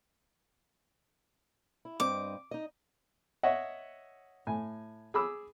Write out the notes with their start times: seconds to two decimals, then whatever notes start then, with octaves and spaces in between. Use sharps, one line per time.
1.85 E4
2.00 G2 C4 D#5 D6
2.51 D#4 D#5
3.43 C#5 D#5 E5 F#5
4.47 A2 G#5
5.14 G#4 B5 D6 E6